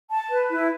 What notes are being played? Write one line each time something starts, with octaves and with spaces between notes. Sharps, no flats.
A5
B4
E4